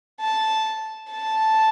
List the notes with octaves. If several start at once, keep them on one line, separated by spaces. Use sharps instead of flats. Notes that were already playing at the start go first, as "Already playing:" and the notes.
A5
A5